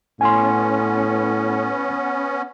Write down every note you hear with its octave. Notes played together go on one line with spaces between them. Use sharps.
A2 B3 C#4 G#5 C6